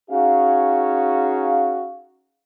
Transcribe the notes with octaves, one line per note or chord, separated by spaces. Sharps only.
C#4 D#4 F#4 G#4 F5